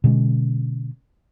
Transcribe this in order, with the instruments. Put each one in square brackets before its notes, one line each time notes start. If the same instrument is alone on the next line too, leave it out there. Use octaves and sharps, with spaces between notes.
[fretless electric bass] B2 D3 G#3 C#4